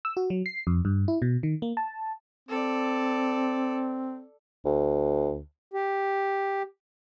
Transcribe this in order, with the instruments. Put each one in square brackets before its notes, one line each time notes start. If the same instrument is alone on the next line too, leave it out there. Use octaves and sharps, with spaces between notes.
[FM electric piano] E6
F#4
F#3
C7
F2
G2
E4
B2
D#3
A#3
A5
[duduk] C4 [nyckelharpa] A4 D5
[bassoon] D2
[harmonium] G4